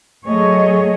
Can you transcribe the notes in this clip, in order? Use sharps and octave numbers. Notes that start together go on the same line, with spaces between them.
F#3 A3 G#4 C#5 D#5